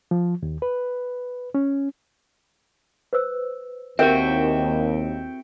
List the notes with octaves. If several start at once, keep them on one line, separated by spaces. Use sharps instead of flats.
F3
D#2
B4
C#4
B4 C5 E6
D#2 C4 E4 F#4 G4 A#4 E5 G5